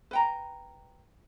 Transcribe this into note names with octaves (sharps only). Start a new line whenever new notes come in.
B4 G5 A#5